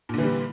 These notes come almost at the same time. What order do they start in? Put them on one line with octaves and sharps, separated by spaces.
A#2 D3 E3 G3